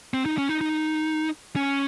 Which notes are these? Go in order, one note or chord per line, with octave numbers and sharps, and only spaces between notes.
C4
D#4
C#4
D#4
D#4
C#4